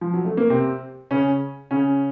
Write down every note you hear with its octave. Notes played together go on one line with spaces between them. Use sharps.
F3
F#3
A3
A#3
C3 C4
C#3 C#4
C#3 C#4